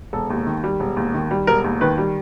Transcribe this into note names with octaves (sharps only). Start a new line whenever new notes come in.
E1 A4
D#2
D#3
G3
E1
D#2
D#3
G3
E1 A#4
D#2
D#3 B4
G3